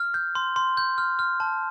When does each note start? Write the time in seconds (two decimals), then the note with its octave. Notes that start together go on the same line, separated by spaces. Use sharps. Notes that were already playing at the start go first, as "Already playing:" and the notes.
Already playing: F6
0.14 G6
0.35 C6
0.56 C6
0.77 G6
0.98 F6
1.19 F6
1.40 A5